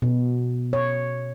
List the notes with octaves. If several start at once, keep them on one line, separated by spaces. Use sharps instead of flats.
B2
C#5